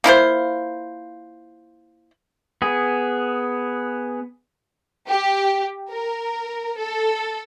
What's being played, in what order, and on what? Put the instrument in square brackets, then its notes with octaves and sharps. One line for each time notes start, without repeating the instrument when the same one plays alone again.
[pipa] A#3 E4 F4 C5
[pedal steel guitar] B3 G#4
[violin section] G4
A#4
A4